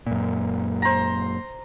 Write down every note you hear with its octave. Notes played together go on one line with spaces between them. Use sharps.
F#2 A#2
C5 A#5